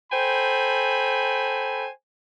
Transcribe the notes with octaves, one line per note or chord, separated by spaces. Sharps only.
A4 C5 G5 G#5 B5